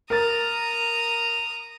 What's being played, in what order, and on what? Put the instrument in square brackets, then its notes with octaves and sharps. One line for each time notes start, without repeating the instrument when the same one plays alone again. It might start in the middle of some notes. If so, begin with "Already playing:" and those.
[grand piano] A#4 A6 [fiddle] A#5 D#6